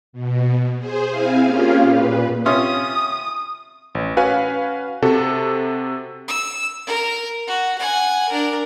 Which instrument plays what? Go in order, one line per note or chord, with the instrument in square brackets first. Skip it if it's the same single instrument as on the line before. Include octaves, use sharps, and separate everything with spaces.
[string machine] B2
G#4 C5
C4 E4 F5 G#5
A#3 C#4 F4 G4 G#4 F5
A#2 B4
[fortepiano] C3 C#4 F4 [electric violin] D#6
[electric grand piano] A1
C#4 F#4 B4 F5 G#5
C3 F#4 A4
[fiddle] E6
A#4
F#4
F#5 G#5
D4 A#4